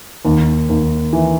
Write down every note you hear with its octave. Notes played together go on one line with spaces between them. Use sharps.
D#2
D#2
E3